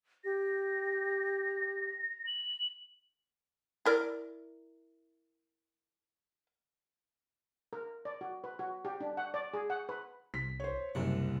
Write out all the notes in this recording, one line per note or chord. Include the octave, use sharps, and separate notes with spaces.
G4 A#6
F#7
E4 A#4 D5
A#4
D5
F#4
B4
F#4
G4
D4
F#5
D5
G#4
F#5
B4
C2 B6
C5 C#5
F#1 C2 F#2 C3 D4 F#5